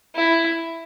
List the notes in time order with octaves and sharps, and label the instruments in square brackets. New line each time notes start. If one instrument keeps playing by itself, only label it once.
[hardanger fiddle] E4